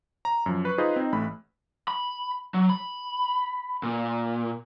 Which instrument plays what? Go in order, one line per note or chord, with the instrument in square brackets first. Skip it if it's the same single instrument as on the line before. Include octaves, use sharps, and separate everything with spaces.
[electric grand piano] A#5
F#2 F3
B4 C#6 F#6
D#4 F4 G#4 B4 C5 D#5
C4 D#4
A1 A3 B5
[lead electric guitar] B5
F#3
B5
A#2